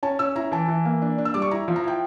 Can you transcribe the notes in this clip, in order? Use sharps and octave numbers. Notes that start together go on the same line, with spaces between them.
C#4 A5
C#4 E6
E4 A#5
E3 A5
E3
A#3
D4
D4
E6
G3 D6
C#6
E4 A#5
F3
A#5
E4 G5